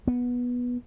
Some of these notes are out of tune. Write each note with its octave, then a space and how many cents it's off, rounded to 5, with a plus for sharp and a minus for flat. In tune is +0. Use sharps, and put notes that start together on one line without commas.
B3 -10